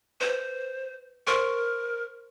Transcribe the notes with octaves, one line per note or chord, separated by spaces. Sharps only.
B4 C5
A#4 C5 C6 C#6